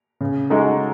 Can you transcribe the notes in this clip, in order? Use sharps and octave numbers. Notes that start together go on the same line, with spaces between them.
C#3
G#3 D#4 F#4 A4